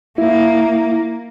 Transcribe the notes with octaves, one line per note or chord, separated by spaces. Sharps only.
A#3 E4